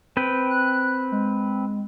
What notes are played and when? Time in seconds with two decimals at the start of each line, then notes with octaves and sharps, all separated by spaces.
0.17 C4 B4 G5
0.50 F#6
1.12 G#3